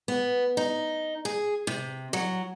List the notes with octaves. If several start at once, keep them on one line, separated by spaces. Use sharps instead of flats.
B3
D#4
G#4
C3
F#3